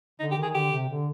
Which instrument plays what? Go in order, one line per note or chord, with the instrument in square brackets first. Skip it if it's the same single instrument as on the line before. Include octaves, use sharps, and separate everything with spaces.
[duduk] D3 [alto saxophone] D#4
[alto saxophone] G4
[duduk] D#3
[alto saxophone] G#4
[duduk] D3 [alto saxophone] G4
[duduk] C3
D3